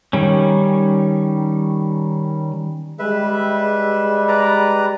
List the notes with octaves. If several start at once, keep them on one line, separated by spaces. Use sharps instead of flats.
D#3 G3 C#4
G3 G#3 B4 E5
B4 D5 A#5